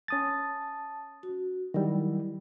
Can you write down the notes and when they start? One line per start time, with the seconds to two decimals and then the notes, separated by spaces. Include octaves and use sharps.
0.08 C#4 A5 D#6 A6
1.23 F#4
1.74 D#3 F#3 G3 E4